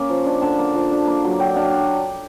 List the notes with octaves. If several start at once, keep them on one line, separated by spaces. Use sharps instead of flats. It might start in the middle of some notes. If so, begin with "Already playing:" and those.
Already playing: A#3 C#4
F3
D4
D3 A5
A#3
F3
D4
A#3
F#3
F#3 G5
D4 F5